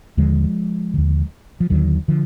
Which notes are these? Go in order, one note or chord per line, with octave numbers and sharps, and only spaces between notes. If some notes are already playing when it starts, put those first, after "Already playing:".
D#2 D3 F3 G#3
D#2 D3
F3
D#2 D3 D#3 F#3
D3 F3